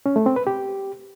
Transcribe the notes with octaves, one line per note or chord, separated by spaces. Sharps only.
C#4
A3
C4
B4
G4